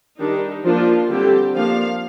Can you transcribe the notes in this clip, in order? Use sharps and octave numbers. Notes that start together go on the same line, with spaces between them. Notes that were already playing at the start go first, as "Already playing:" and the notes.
D#3 G3 D4 D#4
F3 A#3 D4 F4
D3 G3 C4 G4
F3 A#3 D4 F5